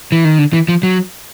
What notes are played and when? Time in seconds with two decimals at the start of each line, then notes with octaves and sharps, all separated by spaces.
0.12 E3
0.25 D#3
0.38 D3
0.53 E3
0.68 F3
0.83 F#3